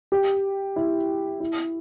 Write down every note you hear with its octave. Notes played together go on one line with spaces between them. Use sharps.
G4
E4
E4